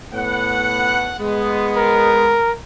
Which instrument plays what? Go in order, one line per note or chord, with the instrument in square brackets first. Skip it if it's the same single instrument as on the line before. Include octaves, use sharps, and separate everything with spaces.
[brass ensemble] A2 B3 F#5
G#3 B3
[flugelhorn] A#4